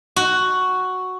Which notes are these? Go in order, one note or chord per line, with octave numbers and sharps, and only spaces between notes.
F#4